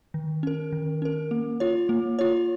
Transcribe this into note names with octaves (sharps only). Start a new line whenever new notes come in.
D#3
C#4 A#4
D#3
C#4 A#4
A#3
F4 C#5
A#3
F4 C#5